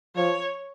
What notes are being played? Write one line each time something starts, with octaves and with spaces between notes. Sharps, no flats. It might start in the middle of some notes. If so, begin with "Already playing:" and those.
F3 C#5